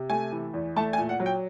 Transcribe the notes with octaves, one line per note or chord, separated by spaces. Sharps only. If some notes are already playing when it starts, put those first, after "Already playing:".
Already playing: C3
A3 G#5
E3
E2
A3 A5
G#5
A#2
F#5
F#3
G5